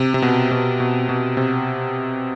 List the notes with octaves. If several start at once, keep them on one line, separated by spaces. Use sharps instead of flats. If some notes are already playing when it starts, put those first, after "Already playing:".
Already playing: C3
C3
B2
B2
B2
B2
C3